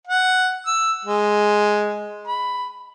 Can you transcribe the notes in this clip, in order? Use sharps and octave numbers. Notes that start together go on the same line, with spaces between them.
F#5
E6
G#3
B5